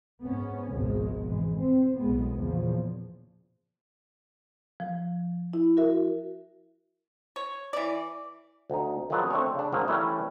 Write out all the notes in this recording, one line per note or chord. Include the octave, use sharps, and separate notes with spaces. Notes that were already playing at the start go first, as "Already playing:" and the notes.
G#2 B3 C#4
G#1 C#2 B2 F3 G#3
G#2 E3 G#3
C4
B1 A2 G#3 B3
E2 A#2 C#3 F3
F3
E4
F#4 A#4 E5
C#5
E3 D5
D2 D#4
D#3 F3 F#3 G#4 A4 B4
A3 C4 D4 C#5
C#3 D4
G#2 D#3 F#3 A#3
E3 G3 A3 C#4 E4